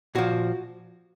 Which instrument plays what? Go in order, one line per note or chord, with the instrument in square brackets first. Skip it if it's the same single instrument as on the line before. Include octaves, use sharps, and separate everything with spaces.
[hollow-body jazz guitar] A#2 F3 F#4